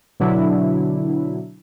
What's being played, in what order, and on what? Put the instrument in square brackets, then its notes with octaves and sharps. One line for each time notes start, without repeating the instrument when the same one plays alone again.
[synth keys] B2 D3 F#3 D4 E4